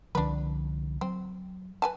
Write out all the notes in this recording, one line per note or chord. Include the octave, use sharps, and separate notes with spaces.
C2 D3 F3 D4 B4
F#3 C4
B4 G#5 A5